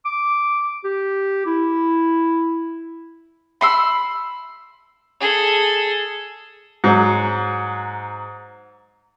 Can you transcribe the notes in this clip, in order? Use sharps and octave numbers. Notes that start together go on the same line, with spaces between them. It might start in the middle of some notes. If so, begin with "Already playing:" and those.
D6
G4
E4
B5 C6 E6
G#4 A4
G#2 F#3